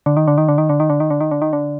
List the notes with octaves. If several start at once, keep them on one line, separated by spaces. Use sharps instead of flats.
D3
D#3
D3
D#3
D3
D#3
D3
D#3
D3
D#3
D3
D#3
D3
D#3
D3